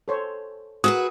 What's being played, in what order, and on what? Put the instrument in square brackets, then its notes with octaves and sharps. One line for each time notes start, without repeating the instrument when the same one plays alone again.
[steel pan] A4 C5 C#5
[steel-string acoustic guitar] F#4 G#4 B4 [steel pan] A#4 E6 [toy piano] D#6